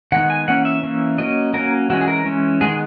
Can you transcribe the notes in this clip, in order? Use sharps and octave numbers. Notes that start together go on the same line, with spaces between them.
D#3 G#3 B3 F#5
G#5
E3 A#3 C#4 F#5
E5
E3 A#3 C#4
F#3 A#3 C#4 D#5
F#3 A#3 C#4 A#4
E3 G#3 C#4 F#4
G#4
A#4
E3 G#3 C#4
D#3 G#3 B3 G#4